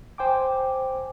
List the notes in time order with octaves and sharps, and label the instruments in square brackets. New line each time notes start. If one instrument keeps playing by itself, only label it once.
[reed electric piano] C5 G5 G#5 D6